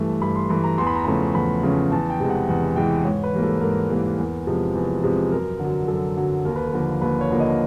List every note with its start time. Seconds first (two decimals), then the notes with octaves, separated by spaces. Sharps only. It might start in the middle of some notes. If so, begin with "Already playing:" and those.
Already playing: G2 E3 A3
0.21 G2 B5
0.36 C6
0.50 E3 A3 B5
0.64 A#5
0.78 E2 C6
0.87 B5
0.95 A#5
1.04 C#3 F3 A3 C#4 B5
1.35 E2 B5
1.63 C#3 F3 A3 C#4
1.92 E2 A5
2.10 G5
2.20 C3 E3 G#3
2.30 F#5
2.48 E2 F#5
2.76 C3 E3 G#3 G5
3.05 G#2 C#5
3.23 B4
3.34 E3 G3 A#3
3.43 A4
3.61 G#2 A#4
3.90 E3 G3 A#3
4.18 E2
4.47 C3 F3 G#3
4.75 E2
5.03 C3 F3 G#3
5.31 F#2 A#4
5.59 D3
5.64 F#3
5.88 F#2 A4
6.17 D3 F#3
6.45 D#2 A#4
6.56 B4
6.67 A#4
6.73 D3 F3 A#3
7.02 D#2 B4
7.21 C#5
7.30 D3 F3 A#3
7.40 D#5